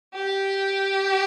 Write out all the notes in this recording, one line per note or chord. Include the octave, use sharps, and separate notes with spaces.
G4